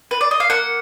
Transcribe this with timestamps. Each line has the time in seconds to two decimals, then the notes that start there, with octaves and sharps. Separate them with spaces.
0.11 B4
0.21 D5
0.31 D#5
0.40 F5
0.50 A#3 F#5